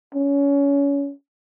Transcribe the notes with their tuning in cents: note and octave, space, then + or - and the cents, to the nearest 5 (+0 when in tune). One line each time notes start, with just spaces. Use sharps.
C#4 +25